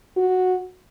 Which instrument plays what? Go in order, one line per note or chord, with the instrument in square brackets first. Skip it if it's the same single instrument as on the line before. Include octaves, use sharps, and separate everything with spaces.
[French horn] F#4